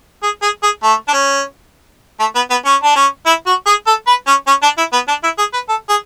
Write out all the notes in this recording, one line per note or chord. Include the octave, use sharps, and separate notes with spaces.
G#4
G#4
G#4
A3
D4
C#4
A3
B3
B3
C#4
D4
C#4
E4
F#4
G#4
A4
B4
C#4
C#4
D4
E4
B3
D4
E4
G#4
B4
A4
G#4